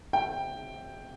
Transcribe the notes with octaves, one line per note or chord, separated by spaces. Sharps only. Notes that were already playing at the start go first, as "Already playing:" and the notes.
G5